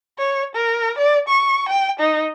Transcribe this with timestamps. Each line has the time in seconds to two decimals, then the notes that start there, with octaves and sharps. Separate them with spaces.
0.18 C#5
0.55 A#4
0.98 D5
1.28 C#6
1.69 G5
1.99 D#4